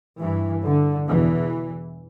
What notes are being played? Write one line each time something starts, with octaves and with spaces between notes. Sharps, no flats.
G2 E3
D3
E2 B2 E3